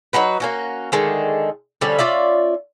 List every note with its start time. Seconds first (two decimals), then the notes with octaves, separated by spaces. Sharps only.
0.13 F#3 D#4 F#4 B4
0.40 A#3 C#4 F#4
0.92 D3 D#3 G#3 A3
1.81 D3 F3 G3 C#4
1.99 C#4 F4 D5 E5